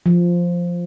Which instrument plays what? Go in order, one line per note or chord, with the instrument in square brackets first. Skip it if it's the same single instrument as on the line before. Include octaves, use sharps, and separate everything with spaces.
[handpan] F3